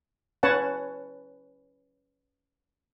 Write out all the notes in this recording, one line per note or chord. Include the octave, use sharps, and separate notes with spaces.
C#4 B4 C#5 F#5 A5